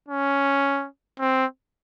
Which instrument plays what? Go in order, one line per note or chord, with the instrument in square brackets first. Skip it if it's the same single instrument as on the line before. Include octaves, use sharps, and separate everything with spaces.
[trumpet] C#4
C4